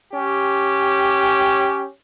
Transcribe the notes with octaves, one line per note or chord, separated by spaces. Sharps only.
C#4 G4